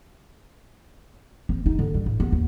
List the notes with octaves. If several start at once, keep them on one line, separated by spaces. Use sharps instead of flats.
C4
D#4
D3
G3
A2
B3
D#2